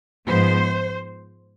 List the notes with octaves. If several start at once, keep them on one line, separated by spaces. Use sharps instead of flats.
G#2 F3 G#3 B3 C5